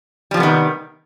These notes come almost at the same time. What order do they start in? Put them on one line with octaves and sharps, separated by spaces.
G3 F3 C3 B3 D#3